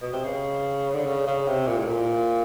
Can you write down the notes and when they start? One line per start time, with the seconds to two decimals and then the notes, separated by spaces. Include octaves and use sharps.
0.02 B2
0.13 C3
0.25 C#3
0.95 D3
1.06 C#3
1.27 C#3
1.47 C3
1.67 A#2
1.78 A2
1.87 A#2